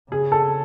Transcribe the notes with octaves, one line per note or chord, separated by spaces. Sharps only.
C#3 G#4
A4